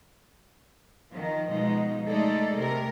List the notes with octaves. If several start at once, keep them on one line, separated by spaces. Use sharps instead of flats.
D#3 F3
B2 F3 G#3 D#4
G#3 A3 D#4 G#4 A4 D5
C3 A3 A#4